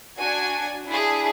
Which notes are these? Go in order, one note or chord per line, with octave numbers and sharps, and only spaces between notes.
D4 F#4 G#5 G#6
D4 E4 G#4